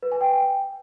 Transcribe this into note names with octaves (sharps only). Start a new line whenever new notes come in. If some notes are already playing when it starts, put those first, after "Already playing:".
B4
G#5
G5